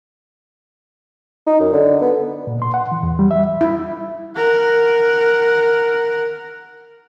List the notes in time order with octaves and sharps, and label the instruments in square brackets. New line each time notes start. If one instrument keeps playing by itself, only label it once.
[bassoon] D#4
F#2
D3
B3
[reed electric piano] A#2
C6
F#5
E3
E2
G3
E5
[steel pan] E4
[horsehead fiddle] A#4 F#5